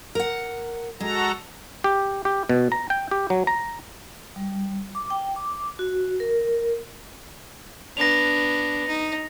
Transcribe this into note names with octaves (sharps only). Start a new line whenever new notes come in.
A#4 F#5
G#3 F#4 A4 A#5
G4
G4
B2
A#5
G5
G4
F#3
A#5
G3
D6
G5
D6
F#4
A#4
B3 D4 A#6 F7
D#4